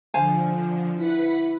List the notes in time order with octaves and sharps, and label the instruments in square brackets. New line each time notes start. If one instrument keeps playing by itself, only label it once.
[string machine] D3 F3 [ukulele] C5 F5 G#5
[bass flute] E4 [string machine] B4 F#5 B6